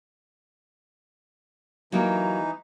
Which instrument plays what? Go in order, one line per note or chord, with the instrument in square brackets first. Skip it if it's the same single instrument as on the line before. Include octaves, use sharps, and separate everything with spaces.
[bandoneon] E3 D#4 [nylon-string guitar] F#3 A#3 G4